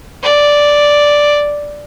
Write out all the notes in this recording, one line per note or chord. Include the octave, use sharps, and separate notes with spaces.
D5